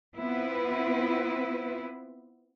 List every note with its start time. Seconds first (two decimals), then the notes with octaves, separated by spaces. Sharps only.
0.18 B3 C4 E4 F4 B4